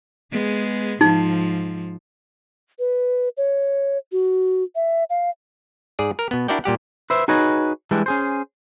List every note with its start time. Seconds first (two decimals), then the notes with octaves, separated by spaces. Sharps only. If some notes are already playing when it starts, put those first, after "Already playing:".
0.32 G#3 B3 G#4
1.01 G#2 F3 D#4
2.79 B4
3.37 C#5
4.12 F#4
4.76 E5
5.10 F5
5.99 G#2 G#4 D5
6.19 A#4
6.31 B2 B3
6.48 D4 E4 F#4 A#4 D5 G5
6.64 A#2 G3 G4 F#5
7.10 B4 C5 E5
7.28 D#4 F#4 G#4 B4 C#5 D#5
7.91 E3 G3 G#3 D4
8.06 C#4 G#4 C5